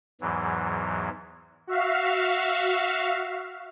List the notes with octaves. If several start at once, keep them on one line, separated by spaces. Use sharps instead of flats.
E2 G#2 E3 F#3
F#4 E5 F5